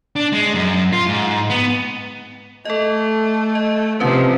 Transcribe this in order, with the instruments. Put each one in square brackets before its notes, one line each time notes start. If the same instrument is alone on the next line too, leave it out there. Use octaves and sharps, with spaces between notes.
[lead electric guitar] D4
G#3
F#2
F4
G#2
B3
[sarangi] A3 [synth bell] A4 D#5
[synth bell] D#5
[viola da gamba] C3 [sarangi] F3 [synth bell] C#4 B4